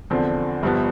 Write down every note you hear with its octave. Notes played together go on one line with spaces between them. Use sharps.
E2 D3 F3 C4
G1 G2 F3 B3